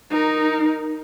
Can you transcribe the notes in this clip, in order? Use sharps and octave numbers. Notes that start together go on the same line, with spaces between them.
D#4 A#4